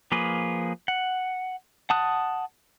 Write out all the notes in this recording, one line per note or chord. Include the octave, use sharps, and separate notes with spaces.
F3 A#3 G#4 B4
F#5
F#5 A5 D#6 F#6